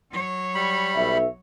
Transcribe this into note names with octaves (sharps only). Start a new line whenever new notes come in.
F#3 C#5
G3 B5
B1 E5